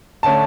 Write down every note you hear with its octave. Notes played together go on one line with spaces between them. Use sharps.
D3 A3 C#4 A5